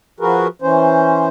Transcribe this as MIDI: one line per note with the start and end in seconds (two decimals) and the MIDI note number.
0.20 0.47 53
0.20 0.47 66
0.20 0.47 68
0.20 0.47 70
0.20 0.47 71
0.62 1.29 52
0.62 1.29 61
0.62 1.29 72